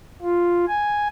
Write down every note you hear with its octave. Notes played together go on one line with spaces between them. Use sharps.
F4
G#5